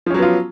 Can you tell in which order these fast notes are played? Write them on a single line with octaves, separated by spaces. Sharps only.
F3 C#4 F#3 B3 F4